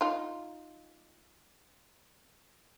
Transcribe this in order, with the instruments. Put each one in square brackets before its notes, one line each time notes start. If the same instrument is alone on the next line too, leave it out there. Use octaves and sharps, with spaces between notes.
[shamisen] D#4 F4